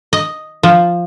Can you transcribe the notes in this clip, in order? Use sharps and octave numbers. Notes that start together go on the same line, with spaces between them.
D#5
F3